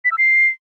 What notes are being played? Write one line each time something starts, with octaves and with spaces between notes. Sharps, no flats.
B6
E6
C7